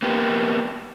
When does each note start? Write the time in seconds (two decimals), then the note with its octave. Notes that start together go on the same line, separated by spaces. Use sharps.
0.02 A#3 B3 G4